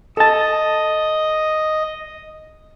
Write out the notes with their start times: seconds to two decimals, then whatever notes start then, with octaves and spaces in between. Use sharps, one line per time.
0.17 A4 D#5 A5